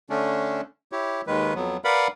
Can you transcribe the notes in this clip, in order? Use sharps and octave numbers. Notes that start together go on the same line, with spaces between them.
D3 A3 C#4 D4
E4 G4 C#5
D#2 D#3 G#3 B4
F2 F#3 B3
A#4 B4 D5 F5 F#5 B5